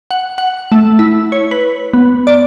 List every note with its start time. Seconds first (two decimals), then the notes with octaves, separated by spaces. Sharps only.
0.11 F#5
0.38 F#5
0.72 A3
0.99 E4
1.32 C#5
1.51 B4
1.93 B3
2.27 D5